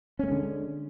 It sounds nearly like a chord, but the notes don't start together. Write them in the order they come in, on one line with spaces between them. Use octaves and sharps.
C#4 A3 G#3 D3